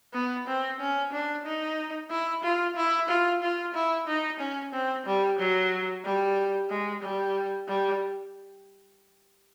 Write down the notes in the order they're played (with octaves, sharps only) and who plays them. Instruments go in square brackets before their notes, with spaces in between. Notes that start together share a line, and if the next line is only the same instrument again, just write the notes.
[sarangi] B3
C4
C#4
D4
D#4
E4
F4
E4
F4
F4
E4
D#4
C#4
C4
G3
F#3
G3
G#3
G3
G3